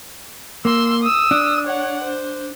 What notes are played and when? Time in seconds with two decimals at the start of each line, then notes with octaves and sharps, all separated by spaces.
0.65 A#3 C6 E6
1.03 D#6 E6
1.31 D4
1.67 C#5 F#5
2.04 C5